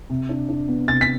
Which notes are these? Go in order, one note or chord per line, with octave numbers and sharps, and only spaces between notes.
C3
D4
D4
B3
C3 A6
B6